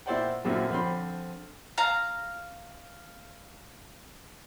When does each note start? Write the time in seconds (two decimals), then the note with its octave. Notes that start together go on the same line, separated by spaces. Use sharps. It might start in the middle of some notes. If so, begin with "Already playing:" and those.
0.06 A#2 E4 C5 D5 F#5 G5
0.44 F#2 A#2 D3 C4 E4
0.70 D3 F3 C4 B5 C6
1.78 F5 A#5